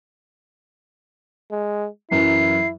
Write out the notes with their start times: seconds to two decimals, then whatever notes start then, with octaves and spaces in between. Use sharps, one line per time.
1.52 G#3
2.11 F#2 E3 F#3 E4 C7